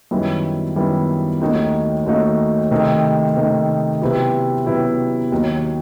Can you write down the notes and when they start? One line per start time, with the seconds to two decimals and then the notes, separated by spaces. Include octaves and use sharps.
0.11 F#2 D#3 G3 B3 E4
0.76 F#2 D#3 G3 B3 E4
1.41 D#2 D#3 A3 D#4 F#4
2.06 D#2 D#3 A3 D#4 F#4
2.71 C3 D#3 A3 D#4
3.37 C3 D#3 A3 D#4
4.02 C3 F#3 B3 E4 G4
4.66 C3 F#3 B3 E4 G4
5.32 D#2 D#3 F#3